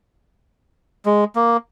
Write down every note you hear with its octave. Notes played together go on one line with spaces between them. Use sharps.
G#3
A#3